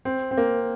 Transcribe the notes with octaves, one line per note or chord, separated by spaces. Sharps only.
C4
C4
A#3